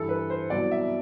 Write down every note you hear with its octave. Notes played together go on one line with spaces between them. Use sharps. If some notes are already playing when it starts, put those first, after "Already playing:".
Already playing: G2 E3 A4
B4
C5
C2 B2 F#3 D5
E5